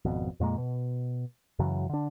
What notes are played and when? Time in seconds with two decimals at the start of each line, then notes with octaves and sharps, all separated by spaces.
0.05 G#1 F2 B2
0.40 F2 A#2 G#3 A#3
0.58 B2
1.59 F#2 C#3 E3 F#3
1.89 D3 D4